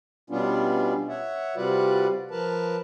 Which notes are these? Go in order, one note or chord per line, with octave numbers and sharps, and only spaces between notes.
B2 G3 B3 C#4 D4 F4
C#5 E5 F#5
C3 G3 F4 F#4 B4 D5
F3 A#4 B4 A5